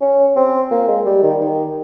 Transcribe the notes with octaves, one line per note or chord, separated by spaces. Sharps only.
C#4
C4
A#3
G#3
G3
D#3
D#3